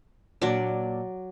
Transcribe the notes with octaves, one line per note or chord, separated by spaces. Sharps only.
A#2 F#3 D4 D5